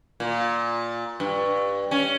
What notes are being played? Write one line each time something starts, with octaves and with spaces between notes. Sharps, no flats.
A#2
G2
C#4